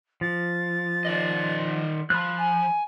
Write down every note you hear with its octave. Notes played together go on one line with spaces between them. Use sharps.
F3 A6
D#3 D5 D#5
F3 B5 F#6
G#5